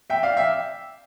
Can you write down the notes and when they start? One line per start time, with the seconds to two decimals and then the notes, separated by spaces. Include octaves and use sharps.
0.10 E5 G5
0.23 D5 F5
0.37 E5 G5